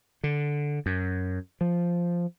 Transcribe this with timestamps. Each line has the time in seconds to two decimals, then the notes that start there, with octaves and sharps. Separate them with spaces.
0.24 D3
0.86 F#2
1.61 F3